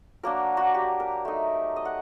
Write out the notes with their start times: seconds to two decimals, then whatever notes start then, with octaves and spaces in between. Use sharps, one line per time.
0.23 F#3 A#3 D4 A#4
0.57 F#4
0.74 G4
1.00 A#4
1.25 A3 D#4
1.76 D#5
1.85 F#5